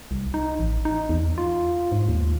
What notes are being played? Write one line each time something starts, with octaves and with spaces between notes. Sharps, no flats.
C2
D#4
A1
D#4
E2
F4
G#2
D#2